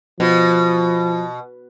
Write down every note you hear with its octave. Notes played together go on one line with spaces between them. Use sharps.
B2 F3